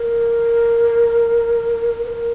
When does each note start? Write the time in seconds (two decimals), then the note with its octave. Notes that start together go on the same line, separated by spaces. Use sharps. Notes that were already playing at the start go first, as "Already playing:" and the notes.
Already playing: A#4
2.05 B4
2.09 A#4